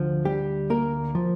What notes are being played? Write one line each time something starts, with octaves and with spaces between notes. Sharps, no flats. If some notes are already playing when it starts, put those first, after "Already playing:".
Already playing: D2 D3 F3
G3 G4
A#3 A#4
F3